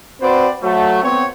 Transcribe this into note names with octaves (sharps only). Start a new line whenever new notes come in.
C4 F#4 B4 C5 D5
F#3 A3
B3 C4 C#5